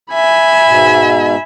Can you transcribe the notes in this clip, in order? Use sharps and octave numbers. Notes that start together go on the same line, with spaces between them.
E5 G#5 B5
G#2 B2